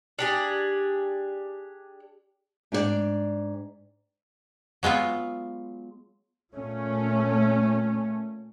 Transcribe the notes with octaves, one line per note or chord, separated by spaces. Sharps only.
D4 G4 G#4
G#2 D4 E4 F4 D5 G5
F#3 G#3 B3 F4
A#2 A3 C#4